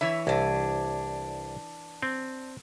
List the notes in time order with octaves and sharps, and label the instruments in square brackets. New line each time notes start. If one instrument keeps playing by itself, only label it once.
[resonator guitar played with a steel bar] E3 C#5 E5 [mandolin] B5
[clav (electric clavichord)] C2 [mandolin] D4 G#5
[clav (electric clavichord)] C4